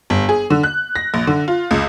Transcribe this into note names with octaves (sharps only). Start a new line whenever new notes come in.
G1
G#4
D3
F#6
A#6
A#1
D3
F4
C#2